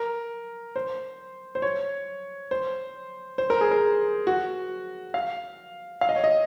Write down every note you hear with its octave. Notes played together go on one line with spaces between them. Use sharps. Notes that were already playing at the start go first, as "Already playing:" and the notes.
Already playing: A#4
C5
C5
C#5
C5
C5
A#4
G#4
A#4
F#4
F5
F5
D#5
C#5
D#5